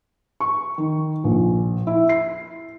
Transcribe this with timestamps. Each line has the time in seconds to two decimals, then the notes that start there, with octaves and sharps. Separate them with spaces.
0.40 C#6
0.78 D#3
1.24 A#1
1.87 E4
2.09 C7